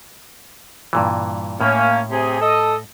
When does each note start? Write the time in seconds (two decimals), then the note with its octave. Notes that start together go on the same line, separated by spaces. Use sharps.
0.93 G2 A#2 E3
1.61 A2 A#3 C#4
2.10 C3 G#4
2.40 A4 D#5